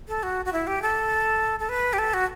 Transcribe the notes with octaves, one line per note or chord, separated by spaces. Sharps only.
A4
F#4
F#4
E4
G4
A4
A4
B4
G4
A4
F#4